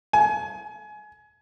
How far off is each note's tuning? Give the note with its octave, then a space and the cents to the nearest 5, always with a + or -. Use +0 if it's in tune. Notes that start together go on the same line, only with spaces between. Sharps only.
G#5 +25